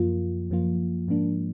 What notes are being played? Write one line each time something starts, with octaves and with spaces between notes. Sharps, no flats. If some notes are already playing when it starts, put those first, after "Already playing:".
Already playing: F#2 F3 A#3 F4
F#2 F3 A#3 F4
G#2 F3 A#3 D4